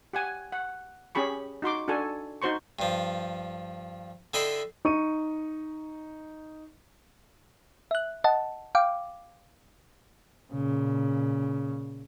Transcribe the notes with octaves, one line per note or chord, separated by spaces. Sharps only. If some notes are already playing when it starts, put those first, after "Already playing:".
G4 F#5 G#5
F#5
C#4 G4 G#4 B5 C#6
D#4 F#4 C6 D6
D4 F#4 A4 G#5
D#4 F#4 C5 C6 C#6
G2 F3
D3 E4 D#5 G5 B5 C6
D#4 C#6 D#7
E5 F#6
D#5 F#5 A5
F5 G5 D6
A#2 C#3